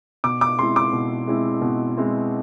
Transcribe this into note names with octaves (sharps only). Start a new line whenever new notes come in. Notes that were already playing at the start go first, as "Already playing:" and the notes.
B2 D6
D6
G#3 C4 E4 C6
D6
B2
G#3 C4 E4
B2
G#3 C4 E4